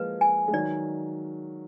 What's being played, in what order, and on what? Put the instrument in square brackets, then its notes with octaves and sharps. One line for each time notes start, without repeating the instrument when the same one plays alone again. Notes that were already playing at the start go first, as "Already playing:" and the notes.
Already playing: [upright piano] F3 G#3 A#3 [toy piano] B4
[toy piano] G#5
[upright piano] G#3
[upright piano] D#3 F#3 [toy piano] D5